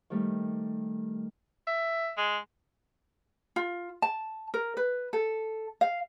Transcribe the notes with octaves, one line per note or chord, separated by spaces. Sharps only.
D#3 G3 A3
E5
G#3
F4
A5
A#4
B4
A4
F5